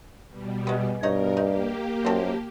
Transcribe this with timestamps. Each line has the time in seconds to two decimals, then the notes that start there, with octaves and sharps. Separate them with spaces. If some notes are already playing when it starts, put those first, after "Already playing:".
0.29 B2 G3
0.67 G#3 B3
1.03 G2 B2 D#4 A#4 C#5 D#5
1.37 A#3 D#4 G4
2.05 F#2 F3 C4